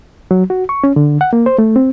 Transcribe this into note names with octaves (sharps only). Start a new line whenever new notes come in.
F#3
F#4
C#6
C#4
D3
F#5
A#3
C5
A3
C4